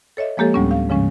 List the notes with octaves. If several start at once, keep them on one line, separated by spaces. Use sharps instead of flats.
A4 C#5 D#5 E5
F3 G#3 A#3 G4 A4 C#5
D2 A2 G3 B3 C#4
F5
G#2 C#3 F3 G#3 C#4